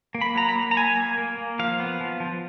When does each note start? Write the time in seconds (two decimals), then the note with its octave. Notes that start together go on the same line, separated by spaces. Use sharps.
0.15 A#3
0.21 B5
0.35 F#3 A#5
0.49 B5
0.55 A#3
0.71 A#5
0.77 F#3 G#5
0.97 A#3
1.18 A#3
1.38 A#3
1.59 F3 F5
1.80 B3
2.01 F3
2.20 F3